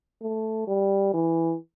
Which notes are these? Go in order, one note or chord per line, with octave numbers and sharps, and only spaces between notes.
A3
G3
E3